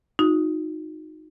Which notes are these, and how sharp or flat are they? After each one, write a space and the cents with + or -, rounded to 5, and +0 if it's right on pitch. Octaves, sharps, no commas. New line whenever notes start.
D#4 +0 F#4 -40